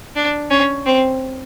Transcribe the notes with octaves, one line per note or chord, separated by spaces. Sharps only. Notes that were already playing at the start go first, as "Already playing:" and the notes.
D4
C#4
C4